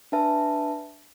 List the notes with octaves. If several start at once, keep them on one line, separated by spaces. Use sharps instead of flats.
D4 B4 E5 A5